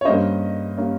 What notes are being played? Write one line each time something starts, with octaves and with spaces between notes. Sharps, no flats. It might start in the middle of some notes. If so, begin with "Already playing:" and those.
C#5
G2 G3 A#3 C#4 C5 D#5
G3 A#3 C#4